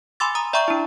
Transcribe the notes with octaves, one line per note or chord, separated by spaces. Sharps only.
G#5 B5 C6 D6 E6 A6
A#5 D#6
D5 E5 G5 A#5 C#6 G6
D4 E4